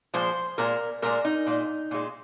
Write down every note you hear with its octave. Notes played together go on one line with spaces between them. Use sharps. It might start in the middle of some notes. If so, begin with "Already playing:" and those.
A#2 F3 G#3 C5
A#2 G#3 A#4
A#2 G#3 A#4
D#4
A#2 G#3
A#2 G#3